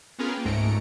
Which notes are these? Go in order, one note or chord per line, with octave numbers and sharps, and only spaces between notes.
B3 C#4 F4 G#4 A#4 B4
A#3 G5
C#2 G#2 A3 A#5 C#7 D7